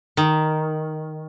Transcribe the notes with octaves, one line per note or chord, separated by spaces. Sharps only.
D#3